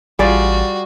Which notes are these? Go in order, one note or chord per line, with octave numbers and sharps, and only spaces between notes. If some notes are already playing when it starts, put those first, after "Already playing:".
A1 G3 F4 F#4 G#4 D5